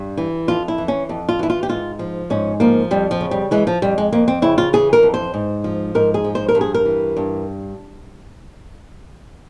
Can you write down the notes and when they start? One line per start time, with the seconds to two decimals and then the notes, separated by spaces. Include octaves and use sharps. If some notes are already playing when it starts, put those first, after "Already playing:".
Already playing: G2
0.17 E3
0.48 F2 F4
0.68 E4
0.78 E3
0.88 C#4
1.09 F2
1.29 F4
1.39 E3 E4
1.50 F4
1.63 G4
1.69 G#2 F4
1.99 F3
2.30 G#2 C#4
2.60 F3 A#3
2.91 F2 G3
3.11 F3
3.21 C#3
3.31 G3
3.51 E3 G#3
3.67 F3
3.82 F2 G3
3.98 G#3
4.12 F2 A#3
4.28 C4
4.42 C#3 E4
4.58 F4
4.73 E3 G#4
4.93 A#4
5.03 F2
5.14 C5
5.34 G#2
5.64 F3
5.95 G#2 A#4
6.14 G#4
6.24 F3
6.35 C5
6.48 A#4
6.55 G2
6.61 G#4
6.74 A#4
6.85 E3
7.17 G2